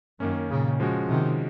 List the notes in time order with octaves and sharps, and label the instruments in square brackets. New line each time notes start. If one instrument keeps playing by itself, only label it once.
[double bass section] F#2 [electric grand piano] D#3 A#3 C#4
[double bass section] A#2 C#3
[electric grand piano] F3 G#3 C#4 F#4
[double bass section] C3 D#3